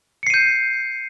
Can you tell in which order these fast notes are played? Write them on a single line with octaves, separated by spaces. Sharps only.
C#7 C7 D#7 G6